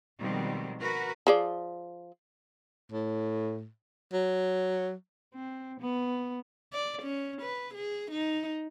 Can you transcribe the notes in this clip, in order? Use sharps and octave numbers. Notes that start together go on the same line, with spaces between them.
B2 D#3 F3 G3 G#3 C4
F#4 A#4 B4
F3 G#4 D5
A2
F#3
C4
B3
D5
C#4
B4
G#4
D#4